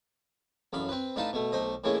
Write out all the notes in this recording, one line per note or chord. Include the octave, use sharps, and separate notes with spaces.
A1 F#2 F5 B5
C4 B4
A2 D4 D#4 F4 B4 A5
B2 A3
B1 A3 C5 D#5
A2 E3 G#3 A#3 C#4